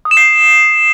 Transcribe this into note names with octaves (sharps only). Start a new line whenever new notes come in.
D#6
E7
C7